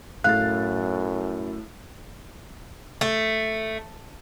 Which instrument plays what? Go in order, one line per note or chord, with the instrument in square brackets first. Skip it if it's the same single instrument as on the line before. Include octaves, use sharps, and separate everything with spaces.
[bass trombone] F#2 [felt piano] A2 A3 A6 [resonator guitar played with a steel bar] F5 [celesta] F#6
[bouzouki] A3